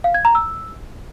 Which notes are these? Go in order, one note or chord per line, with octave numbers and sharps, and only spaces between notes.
F5
G#6
A#5
E6